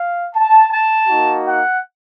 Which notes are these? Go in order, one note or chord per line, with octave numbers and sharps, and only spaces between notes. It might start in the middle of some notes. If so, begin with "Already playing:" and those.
Already playing: F5
A5
A5
A#3 D#4 F#4
F#5